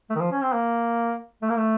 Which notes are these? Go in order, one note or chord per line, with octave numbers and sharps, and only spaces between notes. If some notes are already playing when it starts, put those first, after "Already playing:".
A3
D#3
F3
C#4
C4
A#3
A3
A#3
A3